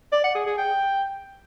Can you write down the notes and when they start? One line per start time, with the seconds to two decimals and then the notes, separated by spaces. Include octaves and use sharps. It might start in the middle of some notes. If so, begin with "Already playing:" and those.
0.12 D5
0.23 F#5
0.35 G#4
0.46 G#4
0.57 G5